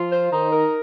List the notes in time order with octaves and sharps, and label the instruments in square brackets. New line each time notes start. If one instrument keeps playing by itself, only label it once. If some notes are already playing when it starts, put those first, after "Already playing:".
Already playing: [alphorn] F3 [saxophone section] F4
[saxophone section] C5
[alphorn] D#3 [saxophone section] D#4
[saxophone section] A#4